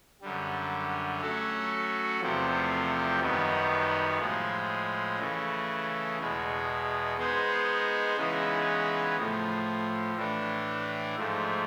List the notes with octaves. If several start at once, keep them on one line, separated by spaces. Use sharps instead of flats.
F#2 D3 G3
F#3 A3 C#4 F#4 A4
E2 C3 F3 A3 C4
F#2 D#3 G3 B3 D#4
A2 F3 G#3
C#3 E3 A3
E2 B2 G#3
G#3 B3 D#4 G#4 C5
C#3 E3 G#3 B3 D#4
A2 F3 A3
A2 E3 A3 D4
G#2 F3 A3